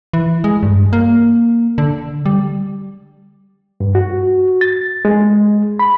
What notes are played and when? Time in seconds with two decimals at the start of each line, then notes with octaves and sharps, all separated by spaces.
0.13 E3
0.44 G#3
0.63 G2
0.93 A#3
1.78 D3
2.26 G3
3.80 G2
3.95 F#4
4.61 A6
5.05 G#3
5.79 B5